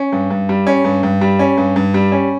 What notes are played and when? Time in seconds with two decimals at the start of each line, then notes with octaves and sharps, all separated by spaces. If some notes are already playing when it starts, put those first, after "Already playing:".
Already playing: C#4
0.12 G2
0.30 G2
0.49 G3
0.67 C#4
0.85 G2
1.03 G2
1.21 G3
1.39 C#4
1.58 G2
1.76 G2
1.94 G3
2.12 C#4